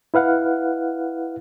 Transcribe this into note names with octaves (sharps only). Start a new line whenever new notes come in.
E4 B4 F5 F#5